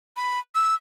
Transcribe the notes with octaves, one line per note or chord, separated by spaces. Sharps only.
B5
E6